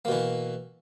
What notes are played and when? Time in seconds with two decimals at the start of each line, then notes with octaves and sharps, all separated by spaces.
0.05 A#3
0.08 B2
0.12 E3